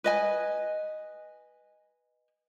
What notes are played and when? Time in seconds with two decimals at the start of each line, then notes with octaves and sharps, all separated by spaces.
0.04 B4 D#5 G#5